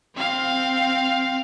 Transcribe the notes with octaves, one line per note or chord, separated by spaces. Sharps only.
C4 F5